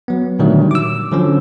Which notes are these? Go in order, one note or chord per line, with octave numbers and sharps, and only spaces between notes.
F#3 B3
A#2 D3 D#3 F#3 G3 A3
D6 E6
D3 F3 F#3 C#4